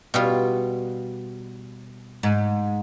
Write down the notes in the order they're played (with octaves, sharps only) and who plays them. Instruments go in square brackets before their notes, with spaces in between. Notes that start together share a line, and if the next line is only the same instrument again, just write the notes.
[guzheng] B2 G3 F4
[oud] G#2